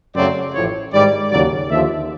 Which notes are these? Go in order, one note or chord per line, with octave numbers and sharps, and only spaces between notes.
F#2 C#3 F#3 A3 C4 D5
A1 A2 F3 C#5
G#2 D#3 G3 D5
D#2 C#3 F#3 D5
D#2 D3 F3 E5